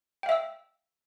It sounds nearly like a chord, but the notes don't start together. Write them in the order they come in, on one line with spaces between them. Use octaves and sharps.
G5 F5 E5 E6